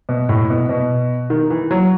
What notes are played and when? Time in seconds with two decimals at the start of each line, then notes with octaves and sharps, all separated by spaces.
0.09 B2
0.29 A2
0.50 B2
0.69 B2
1.30 D#3
1.50 E3
1.71 F#3